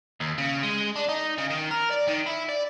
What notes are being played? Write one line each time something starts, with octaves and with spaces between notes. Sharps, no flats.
D#2
C#3
G#3
D4
D#4
C#3
D#3
A#4
D5
D#3
E4
D5